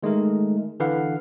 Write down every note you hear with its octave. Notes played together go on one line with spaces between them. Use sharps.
D#3 G#3 A3 D#4 A#4
D3 E3 B4 F5 F#5